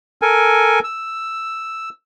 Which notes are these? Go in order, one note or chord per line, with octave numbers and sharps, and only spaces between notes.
A4 A#4 G#5
E6